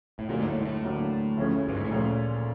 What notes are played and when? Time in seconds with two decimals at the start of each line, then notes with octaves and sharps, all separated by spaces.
0.19 A2
0.29 D2 A#2 D3 F#3 A#3 D4
0.40 G#2
0.47 A2
0.61 G#2
0.65 A2
0.83 D2 D3 F#3 A#3 D4
1.37 D2 C#3 F3 A3 C#4
1.68 G2
1.76 G#2
1.84 A2
1.91 D2 A#2 C#3 F3 A3 C#4